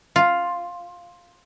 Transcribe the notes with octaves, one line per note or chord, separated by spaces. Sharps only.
F4